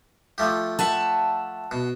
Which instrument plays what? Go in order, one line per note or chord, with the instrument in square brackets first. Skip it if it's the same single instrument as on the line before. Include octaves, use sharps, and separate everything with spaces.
[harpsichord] F3 A3 G4
[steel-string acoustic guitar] E5 F#5 A5
[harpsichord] B2